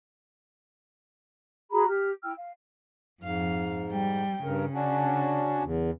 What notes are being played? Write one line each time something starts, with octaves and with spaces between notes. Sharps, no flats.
F#4 G#4 A#5 B5
G4 F6
E4 G5 E6 F6
F5
F2 G#2 F5
G3 G5
G2 C#3 A#4
C#4 D4 F#4
E2